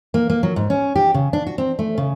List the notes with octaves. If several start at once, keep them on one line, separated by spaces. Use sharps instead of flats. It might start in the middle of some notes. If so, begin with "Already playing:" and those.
A#3
A#3
F#3
G#2
C#4
G4
C#3
D4
F#4
C4
A3
C#3